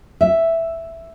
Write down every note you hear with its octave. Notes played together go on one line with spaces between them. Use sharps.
E5